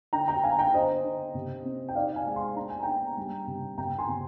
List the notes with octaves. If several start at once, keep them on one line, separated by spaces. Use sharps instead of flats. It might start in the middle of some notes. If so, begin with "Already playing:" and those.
D3 G5 A#5
G5 A#5
D3 F5 G#5
G5 A#5
D3 C5 D#5
D3
C3
C4
G5
D#4 D5 F5
F5 G#5
G#3
G#5 C6
D4 A#5
G#5
D4 G5 A#5
G3
C3
C3 G5 A#5
G#5 C6
C3